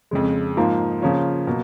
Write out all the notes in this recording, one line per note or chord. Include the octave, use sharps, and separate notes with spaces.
F2 C#3 G#3
G#2 F3 A#3 F4
C#3 F3 A#3 C#4 F4
B2 F#3 A#3